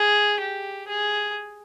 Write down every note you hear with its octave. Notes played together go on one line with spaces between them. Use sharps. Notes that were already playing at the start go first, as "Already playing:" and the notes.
Already playing: G#4
G4
G#4